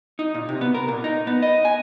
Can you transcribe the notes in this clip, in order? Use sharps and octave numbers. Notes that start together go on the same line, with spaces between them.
D#4
A#2
C3
B3
A#4
A#2
D#4
B3
D#5
G#5